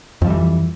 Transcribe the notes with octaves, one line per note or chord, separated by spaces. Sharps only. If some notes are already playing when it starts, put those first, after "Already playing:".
F2 E3 F3 G3